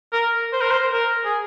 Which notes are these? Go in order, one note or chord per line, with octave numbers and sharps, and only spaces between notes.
A#4
C5
A#4
C5
A#4
G#4